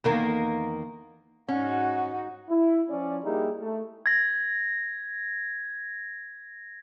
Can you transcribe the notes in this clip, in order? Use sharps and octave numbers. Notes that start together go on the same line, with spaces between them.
E2 D#3 A#3
G#2 C#4 D#4 F#4 F#5
E4
F3 C#4 D5
G3 A#3 D#4 E4 G4 G#4
A3
G#6 A#6